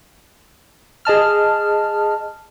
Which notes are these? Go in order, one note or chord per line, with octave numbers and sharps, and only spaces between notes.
G#4 D#5 A5 F6